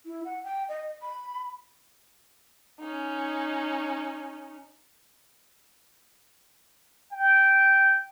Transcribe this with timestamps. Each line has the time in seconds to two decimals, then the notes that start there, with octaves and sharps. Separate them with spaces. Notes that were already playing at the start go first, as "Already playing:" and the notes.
0.06 E4
0.25 F#5
0.44 G5
0.69 D#5
1.03 B5
2.80 C#4 D#4
7.12 G5